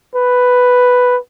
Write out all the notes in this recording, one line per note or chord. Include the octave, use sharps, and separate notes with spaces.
B4